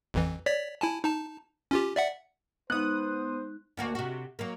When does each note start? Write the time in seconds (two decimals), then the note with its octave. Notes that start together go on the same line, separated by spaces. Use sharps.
0.14 A1 F2 E3
0.46 C#5 D5 B6
0.81 E4 G#5 A5
1.04 D#4 A5
1.71 C#4 F4 G4
1.96 D5 E5 F#5
2.70 G#3 B3 D#4 C5 D#6 F#6
3.77 D2 A#3 F#4
3.95 C3 F#4
4.39 F#3 A#3